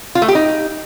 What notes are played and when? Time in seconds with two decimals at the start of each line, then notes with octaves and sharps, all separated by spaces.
0.15 F4
0.22 A3
0.28 G4
0.35 D#4